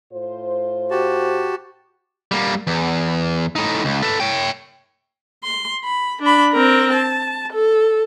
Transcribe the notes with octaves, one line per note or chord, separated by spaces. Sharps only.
A2 F4 C5
F#4 G4 A5
G3 A#3
E2
A2 D#4
C#2
A4 B4
C#5 G5
C6
B5
D4 B5
C4 A#4
A5
A4